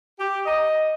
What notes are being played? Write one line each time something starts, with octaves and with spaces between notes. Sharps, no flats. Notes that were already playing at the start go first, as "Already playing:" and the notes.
G4
D#5